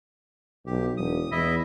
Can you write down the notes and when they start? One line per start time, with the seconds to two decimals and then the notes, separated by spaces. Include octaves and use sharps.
0.66 B1 G4
0.97 E1 D#6
1.31 E2 E4 D#5 E5